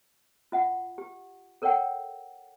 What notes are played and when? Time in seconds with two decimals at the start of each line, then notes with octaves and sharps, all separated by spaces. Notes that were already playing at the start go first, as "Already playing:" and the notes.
0.52 F4 E5 F#5
0.98 G4
1.62 A4 A#4 C#5 E5 F#5 G5